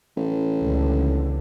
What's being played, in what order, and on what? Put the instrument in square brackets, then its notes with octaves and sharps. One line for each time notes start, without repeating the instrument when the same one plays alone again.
[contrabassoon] A1
[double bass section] C#2 A#2 D3